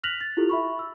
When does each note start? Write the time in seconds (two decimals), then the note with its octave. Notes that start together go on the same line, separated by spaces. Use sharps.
0.03 F6 F#6 A#6 B6 F7 F#7
0.21 A6
0.37 E4 F4 G4 A4
0.49 E5 B5 C#6
0.79 E6